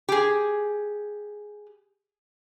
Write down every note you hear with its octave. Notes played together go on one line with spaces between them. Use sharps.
G4 G#4